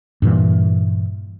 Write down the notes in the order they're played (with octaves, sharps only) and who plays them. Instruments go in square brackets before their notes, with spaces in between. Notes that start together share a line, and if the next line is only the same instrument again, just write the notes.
[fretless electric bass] G2 A#2 E3